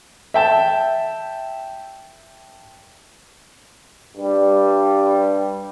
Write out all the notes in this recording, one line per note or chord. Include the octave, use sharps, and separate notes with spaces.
E5 G5 A5
G2 G3